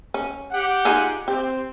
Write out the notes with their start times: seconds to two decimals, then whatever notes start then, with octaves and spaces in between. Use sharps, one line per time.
0.14 C#4
0.51 G4 F#5
0.85 D#4 F4 G#4
1.28 C4 G4